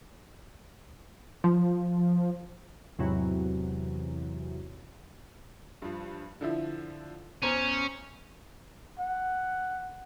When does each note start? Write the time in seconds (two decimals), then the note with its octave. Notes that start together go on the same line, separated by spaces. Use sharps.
1.44 F3
2.99 E2 G#2 C3 E3 F#3
5.82 G2 F3
6.41 D3 F3 E4
7.42 E2 C#4 C5 A#5
8.99 F#5